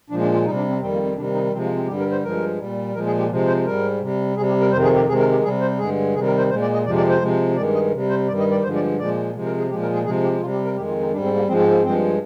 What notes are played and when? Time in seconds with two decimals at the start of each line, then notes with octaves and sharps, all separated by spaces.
0.10 A#2 F3 G#3 D4
0.22 D4
0.33 F4
0.46 C3 G3 D#4
0.57 D4
0.69 C4
0.81 F2 D#3 G3 C4
0.93 A#3
1.05 C4
1.16 C3 D#3 G3 D4
1.35 D#4
1.52 C3 F3 G#3 C4
1.64 A#3
1.76 C4
1.87 G2 D3 G3 G4
1.99 A#4
2.12 C5
2.23 G2 F3 G#3 A#4
2.59 A#2 G3
2.94 A#2 F3 G#3 A#4
3.06 G#4
3.18 G4
3.30 C3 F3 G#3
3.48 C5
3.65 G#2 G3 A#4
4.01 C3 G3
4.36 C3 G3 G#4
4.48 G4
4.61 A#4
4.72 F2 C3 D#3 C5
4.84 G#4
4.96 G4
5.08 C3 D#3 G#3 G#4
5.20 A#4
5.31 G4
5.43 C3 G3 G#4
5.61 C5
5.79 G2 D3 G#3 G#4
6.14 C3 D#3 G3 G#4
6.26 A#4
6.38 C5
6.49 A#2 G#3 C5
6.62 D5
6.73 D#5
6.86 F2 C3 F3 G#3 D5
6.97 D5
7.09 C5
7.21 C3 F3 G#3
7.57 G2 D#3 G#3 D5
7.74 D#5
7.92 C3 G3
8.10 C5
8.27 G2 D#3 G3 D5
8.39 D#5
8.51 D5
8.63 G2 D3 F3 G#3 C5
8.75 D5
8.99 A#2 F3 G#3 D5
9.35 C3 F3 G#3
9.46 A#4
9.58 G#4
9.70 A#2 F3 G#3 G4
9.82 A#4
9.93 G#4
10.05 C3 F3 G#3 G#4
10.23 G4
10.41 C3 F4
10.44 G3
10.53 G4
10.65 A#4
10.76 F2 D#3 G#3 G4
10.88 F4
11.00 D#4
11.12 G#2 G3 D4
11.24 C4
11.36 A#3
11.48 G#2 F3 G#3 C4
11.59 C4
11.71 A#3
11.83 G2 F3 G#3 C4